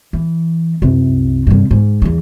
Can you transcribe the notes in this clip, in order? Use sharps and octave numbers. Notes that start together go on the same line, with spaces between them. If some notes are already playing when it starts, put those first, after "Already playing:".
E3
C2 F#2
G2 C3
G#2
E2 E3